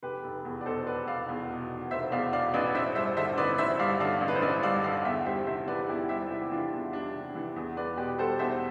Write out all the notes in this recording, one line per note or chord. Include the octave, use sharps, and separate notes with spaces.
F1 G4 B4
F1
E2
D5
B2 A4 C5
F1 B4 D5
F1 D5 F5
E2
B2
F1
F1 C5 E5
E2 D5 F5
B2 D5 F5
A1 B4 D5
A1 C5 E5
G2 C5 E5
D3 C5 E5
A1 B4 D5
A1 C5 E5
G2 D5 F5
D3 D5 F5
A1
B4
C5
A1 B4 D5
G2 D5 F5
D3 D5 F5
E2 E5 G5
G3 C5 E5
C3 C5 E5
E3 B4 D5
E2 E4 G4
G3 C5 E5
C3 E4 G4
E3 D4 F4
E2
G3 D4
C3
E3
E2
E2 B4 D5
B2 G4 B4
G3 A4 C5
E2 C5 E5